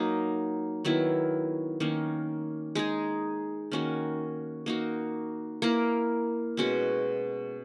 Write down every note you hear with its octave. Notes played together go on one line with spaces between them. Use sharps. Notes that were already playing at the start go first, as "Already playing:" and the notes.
Already playing: F#3 A#3 D#4
D#3 F#3 B3 E4
D#3 A#3 C#4
G#3 D#4 G#4
D#3 A#3 C#4 F#4
A#3 D#4 F#4
A#3 E4 A#4
B2 G#3 C#4 F#4